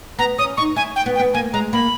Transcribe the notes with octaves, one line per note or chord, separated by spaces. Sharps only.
B3 A#5
C#4 D#6
D#4 C#6
E4 G#5
G5
B3
G5
B3
A#3 G#5
G#3 A#5
A#3 B5